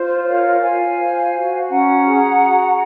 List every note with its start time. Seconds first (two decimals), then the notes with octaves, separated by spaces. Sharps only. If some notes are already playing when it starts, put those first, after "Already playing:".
Already playing: F4 C5
0.26 A#4 C#5 F5
0.62 F4 F5 G#5
0.98 C5
1.34 F#4
1.70 C#4 F#5 A#5
2.06 G#4
2.42 F#4